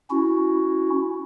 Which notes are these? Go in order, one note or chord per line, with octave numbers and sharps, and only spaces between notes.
C#4 E4 F#4